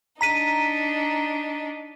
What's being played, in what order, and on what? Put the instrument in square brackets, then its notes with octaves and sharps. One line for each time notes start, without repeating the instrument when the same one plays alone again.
[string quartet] D4 D#4 [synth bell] A#5 B6 D#7